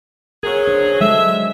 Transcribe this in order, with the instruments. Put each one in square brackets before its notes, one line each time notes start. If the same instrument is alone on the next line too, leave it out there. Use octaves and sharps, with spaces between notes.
[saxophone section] F#3 C#4 G#4 [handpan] A#4
[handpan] D4 C5
[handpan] F#3 G#3 A4 [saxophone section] E5